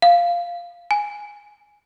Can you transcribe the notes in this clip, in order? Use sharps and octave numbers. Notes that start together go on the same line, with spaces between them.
F5
G#5